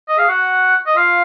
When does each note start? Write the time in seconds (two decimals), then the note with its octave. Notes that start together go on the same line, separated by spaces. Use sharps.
0.08 D#5
0.18 G#4 F5
0.28 F#4 F#5
0.86 D#5
0.96 F4 F5